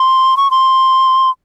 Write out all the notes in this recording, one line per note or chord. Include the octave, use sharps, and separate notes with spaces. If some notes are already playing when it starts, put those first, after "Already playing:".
Already playing: C6
C#6
C6